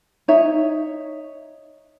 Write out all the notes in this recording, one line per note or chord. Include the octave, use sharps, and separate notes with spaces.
D#4 C#5 E5